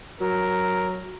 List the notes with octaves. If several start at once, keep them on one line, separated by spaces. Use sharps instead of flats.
F#3 A#4